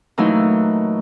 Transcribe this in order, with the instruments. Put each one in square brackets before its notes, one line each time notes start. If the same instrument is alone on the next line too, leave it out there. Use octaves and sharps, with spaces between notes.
[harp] A#2 E3 F#3 A3 D#4 F#4